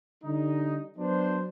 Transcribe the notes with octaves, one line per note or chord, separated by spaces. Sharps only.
D3 G3 D#4
F#3 B3 D4 C5